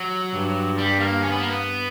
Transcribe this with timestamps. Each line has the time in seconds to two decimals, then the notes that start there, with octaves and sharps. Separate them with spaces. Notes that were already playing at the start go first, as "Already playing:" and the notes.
Already playing: F#3
0.33 G2
0.78 G3
1.00 A#3
1.23 C#4
1.31 B3
1.40 A#3
1.48 B3